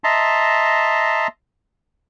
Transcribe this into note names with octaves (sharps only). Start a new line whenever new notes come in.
D#5 E5 A5 A#5 C6